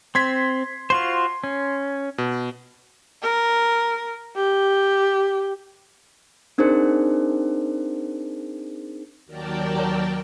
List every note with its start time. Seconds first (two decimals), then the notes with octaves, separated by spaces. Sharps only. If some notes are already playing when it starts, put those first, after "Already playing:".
0.15 C4 C6 G#6 B6
0.90 F4 F#4 C5 C6
1.44 C#4
2.18 B2
3.23 A#4
4.36 G4
6.58 C4 D4 D#4 G#4 A#4 C5
9.26 D#2 F#3 A#4 D5 G5 A5